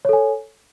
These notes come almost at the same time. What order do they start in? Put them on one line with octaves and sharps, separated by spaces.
C#5 A4 G#5